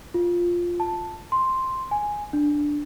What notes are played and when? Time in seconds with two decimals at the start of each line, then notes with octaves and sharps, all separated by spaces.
0.14 F4
0.80 A5
1.32 C6
1.91 G#5
2.33 D4